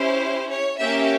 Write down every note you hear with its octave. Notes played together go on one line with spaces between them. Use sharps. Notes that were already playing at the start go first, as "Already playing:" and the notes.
Already playing: C#4 E4 G4 C5
C#5
A#3 C#4 G4 E5